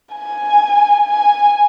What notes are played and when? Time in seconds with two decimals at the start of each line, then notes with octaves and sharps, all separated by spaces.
0.14 G#5
1.08 G#5